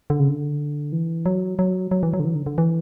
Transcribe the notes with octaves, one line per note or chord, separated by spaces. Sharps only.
D3
C#3
D3
E3
F#3
F#3
F#3
E3
F#3
D3
E3
D3
D3
E3